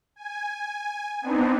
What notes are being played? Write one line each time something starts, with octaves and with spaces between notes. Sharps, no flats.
G#5
B3 C4 D4 D#4